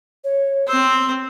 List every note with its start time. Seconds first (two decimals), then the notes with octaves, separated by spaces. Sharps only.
0.24 C#5
0.68 C4 C5 E6